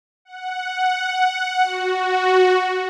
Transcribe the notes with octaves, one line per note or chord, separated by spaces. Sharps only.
F#5
F#4